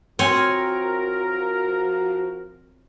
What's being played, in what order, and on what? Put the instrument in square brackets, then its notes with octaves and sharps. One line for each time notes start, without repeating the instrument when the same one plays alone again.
[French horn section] F3 F#4 [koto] C4 G#5 [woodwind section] A#4 [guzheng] C#5